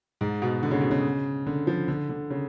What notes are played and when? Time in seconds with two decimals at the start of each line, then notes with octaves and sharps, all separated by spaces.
0.21 G#2
0.42 B2
0.63 D3
0.71 C#3
0.81 B2
0.91 C#3
1.46 D3
1.67 F3
1.88 D3
2.09 D3
2.30 C#3